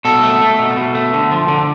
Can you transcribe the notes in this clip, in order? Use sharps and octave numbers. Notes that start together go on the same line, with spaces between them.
B2 A4
A3
A3
B2
B2
A3
D3
F3
D3